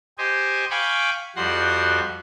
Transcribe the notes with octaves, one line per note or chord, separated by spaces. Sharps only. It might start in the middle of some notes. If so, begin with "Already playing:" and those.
G4 C5 D#5 G#5
F5 G5 G#5 B5 C#6 D6
F2 G3 F#4 F#5 C6